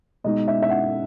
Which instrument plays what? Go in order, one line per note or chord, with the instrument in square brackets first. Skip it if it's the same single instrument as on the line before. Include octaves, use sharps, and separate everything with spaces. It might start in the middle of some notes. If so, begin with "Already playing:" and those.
[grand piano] B2 G#3 D#4 [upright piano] D#5
[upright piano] E5
E5
F#5